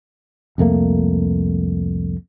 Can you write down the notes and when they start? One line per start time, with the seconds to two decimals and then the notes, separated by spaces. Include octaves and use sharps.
0.58 C2 F2 A3 A#3